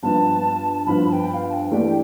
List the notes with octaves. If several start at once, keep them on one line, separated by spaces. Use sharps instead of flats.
G2 F3 B3 F4 A5
G2 F3 B3 F4 B5
A5
G5
G5
F5
A5
G5
E3 A3 D4 G4